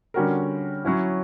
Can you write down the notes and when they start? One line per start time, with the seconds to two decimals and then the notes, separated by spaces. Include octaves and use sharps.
0.14 D3 G3 C#4 F#4 A#4
0.85 F#3 C#4 E4